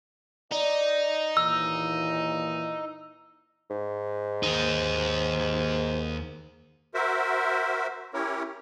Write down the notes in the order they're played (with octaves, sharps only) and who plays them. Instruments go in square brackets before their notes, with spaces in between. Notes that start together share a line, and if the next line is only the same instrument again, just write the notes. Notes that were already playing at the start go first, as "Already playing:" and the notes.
[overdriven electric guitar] D#4 [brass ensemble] D5
[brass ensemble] D#2 A#2 E3 [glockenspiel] E6
[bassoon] G#2
[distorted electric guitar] D#2 D#4
[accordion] F#4 A#4 C5 E5
C#4 E4 G4 A#4 C#5